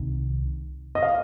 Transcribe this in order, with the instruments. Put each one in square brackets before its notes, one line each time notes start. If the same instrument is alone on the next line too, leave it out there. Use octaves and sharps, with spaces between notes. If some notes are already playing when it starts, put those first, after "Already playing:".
Already playing: [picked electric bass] C2 C3 D#3
[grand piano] D#5
F5